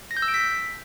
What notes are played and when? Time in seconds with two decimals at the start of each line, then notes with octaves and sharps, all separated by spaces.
0.11 A#6
0.17 G6
0.22 E6
0.28 D7
0.34 B6